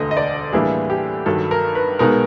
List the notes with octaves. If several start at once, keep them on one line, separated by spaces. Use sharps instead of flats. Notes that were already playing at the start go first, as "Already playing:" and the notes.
Already playing: E1 D2 D3 D#5
D#5
D5
A2 E3 G3 A#3 D4 G#4
G4
G2 D#3 F#3 A4
A#4
B4
B1 B2 G#3 B3 D#4 A#4